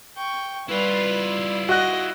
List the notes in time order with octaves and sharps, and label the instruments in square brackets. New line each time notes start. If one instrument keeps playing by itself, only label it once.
[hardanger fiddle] G5 C#6
[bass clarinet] G3 [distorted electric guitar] E4 F4 [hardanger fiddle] B4
[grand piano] F#4 F#6 [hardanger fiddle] D#5